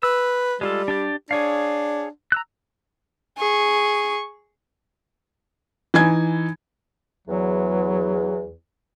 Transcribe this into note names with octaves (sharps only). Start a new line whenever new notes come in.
B4 E6
G3 G#3 F4 A4
D4 G4 D5
D4 G#4 C#5 F5
A#5 E6 F#6
G#4 C#6
E3 D#4 G#5 G#6
E2 F#3